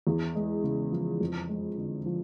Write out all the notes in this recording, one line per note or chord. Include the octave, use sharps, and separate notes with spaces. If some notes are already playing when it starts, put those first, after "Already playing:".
E2
G#3
C#3
F3
F2
G#3
D3
F3